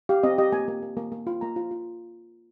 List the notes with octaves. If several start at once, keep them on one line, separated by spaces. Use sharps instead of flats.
G4 F5
C4 D#5
G4 D#5
A#3 G#5
A#3
A#3
A#3
A#3
F4
A#3 A#5
F4
F4